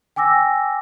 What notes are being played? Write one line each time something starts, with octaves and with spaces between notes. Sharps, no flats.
G5 G#5 D6 E6 A#6